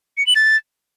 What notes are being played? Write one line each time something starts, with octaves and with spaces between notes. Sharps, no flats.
C#7
F#7
A6